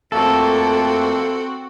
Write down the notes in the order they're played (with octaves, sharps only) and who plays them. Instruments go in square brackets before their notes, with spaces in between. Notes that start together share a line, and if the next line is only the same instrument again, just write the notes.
[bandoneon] F2 A3 A#3 [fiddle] C4 F#4 [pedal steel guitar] A4